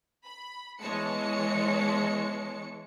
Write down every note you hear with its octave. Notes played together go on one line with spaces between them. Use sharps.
B5
E3 G#3 B3 C#5 A5 C#7